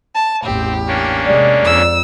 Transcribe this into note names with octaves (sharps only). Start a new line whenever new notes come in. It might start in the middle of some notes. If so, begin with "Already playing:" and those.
A5
A1 E2 C4 G4
A#3 C#4 D4
C3 G#3 D5
F2 E6